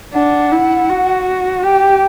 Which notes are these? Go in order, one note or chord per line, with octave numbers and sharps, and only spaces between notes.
D4 F#5
E4
F#4
G4 G5